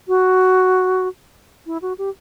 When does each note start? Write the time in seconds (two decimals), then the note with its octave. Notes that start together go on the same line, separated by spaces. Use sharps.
0.08 F#4
1.66 E4
1.82 F#4
1.98 G4